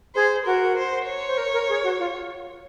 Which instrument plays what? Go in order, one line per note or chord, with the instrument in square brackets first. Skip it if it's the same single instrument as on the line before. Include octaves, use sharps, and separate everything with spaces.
[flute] G#4 [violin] C5
[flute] F#4 [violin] A#4
[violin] C5
C#5
[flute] C5
A#4
A#4
G#4
F#4
F4